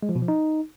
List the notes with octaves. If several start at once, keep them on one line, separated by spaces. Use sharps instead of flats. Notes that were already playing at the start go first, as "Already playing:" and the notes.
G#3
F3
B2
F3
D#4